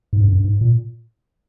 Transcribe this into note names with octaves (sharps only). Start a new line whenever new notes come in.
G#2
G2
F#2
G2
G#2
A#2